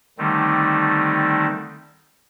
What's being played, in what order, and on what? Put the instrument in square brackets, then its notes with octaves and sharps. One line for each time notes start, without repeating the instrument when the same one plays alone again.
[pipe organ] D3 D#3 G3 A3 C4 D#4